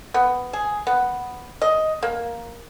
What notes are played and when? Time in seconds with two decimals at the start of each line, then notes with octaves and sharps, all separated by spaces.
0.14 B3
0.53 G#4
0.87 B3
1.62 D#5
2.03 A#3